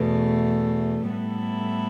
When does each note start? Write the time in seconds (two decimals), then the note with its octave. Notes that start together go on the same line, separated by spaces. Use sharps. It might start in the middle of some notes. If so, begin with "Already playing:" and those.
Already playing: E2 B2 A3
1.09 A2 G3 B3 E4 A4